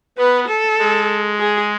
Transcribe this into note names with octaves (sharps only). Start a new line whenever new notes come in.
B3 B4
A4
G#3
G#4